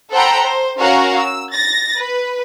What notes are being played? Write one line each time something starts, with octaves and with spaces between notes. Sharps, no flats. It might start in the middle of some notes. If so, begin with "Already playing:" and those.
A4 C5 F#5 G5 A#5 B5
C5
C#4 F#4 A#4 F5 F#5
E6
A6 A#6
B4